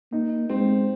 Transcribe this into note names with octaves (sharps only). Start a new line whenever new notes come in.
A#3 D#4
G#3 C4